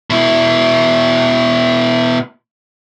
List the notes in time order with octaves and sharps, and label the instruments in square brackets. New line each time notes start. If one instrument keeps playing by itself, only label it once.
[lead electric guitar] B2 E4